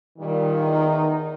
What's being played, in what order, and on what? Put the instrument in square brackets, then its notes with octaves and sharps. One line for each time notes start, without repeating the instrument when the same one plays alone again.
[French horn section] A#2 G3 [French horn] D#3
[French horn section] E2 D#4